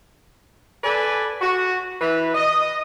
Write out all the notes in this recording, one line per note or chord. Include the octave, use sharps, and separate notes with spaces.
A4 B4 D5 G#5
F#4
E3 B4
D#5